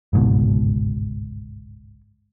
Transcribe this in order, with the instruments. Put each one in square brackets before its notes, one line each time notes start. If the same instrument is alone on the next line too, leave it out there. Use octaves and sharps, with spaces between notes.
[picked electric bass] G1 C#2 G#2 B2